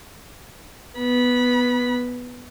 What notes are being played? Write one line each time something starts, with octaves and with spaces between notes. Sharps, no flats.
B3 B5